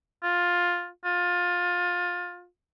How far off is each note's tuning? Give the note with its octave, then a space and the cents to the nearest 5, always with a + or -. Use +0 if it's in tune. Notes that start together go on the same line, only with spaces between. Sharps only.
F4 +10
F4 +20